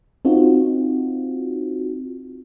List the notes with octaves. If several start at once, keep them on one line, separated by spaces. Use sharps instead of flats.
C4 D#4 F4 F#4